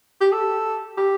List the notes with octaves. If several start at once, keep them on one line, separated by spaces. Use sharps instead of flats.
G4
A4
G4